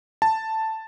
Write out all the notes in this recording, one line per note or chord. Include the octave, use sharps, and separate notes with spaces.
A5